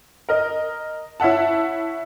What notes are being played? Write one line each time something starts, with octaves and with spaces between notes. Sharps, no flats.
A#4 D#5
E4 C#5 E5 F#5 A5